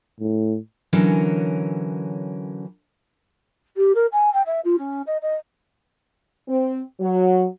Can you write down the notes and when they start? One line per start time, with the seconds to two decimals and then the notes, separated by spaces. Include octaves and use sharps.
0.20 A2
0.93 D3 E3 F#3 C#4 A#4
3.76 G4
3.95 A#4
4.12 G#5
4.33 G5
4.46 E5
4.64 F4
4.78 C#4
5.06 D#5
5.22 D#5
6.48 C4
7.00 F#3